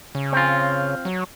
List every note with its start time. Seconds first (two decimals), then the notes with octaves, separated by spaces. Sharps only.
0.15 C#3
0.33 C4 F4
1.05 F#3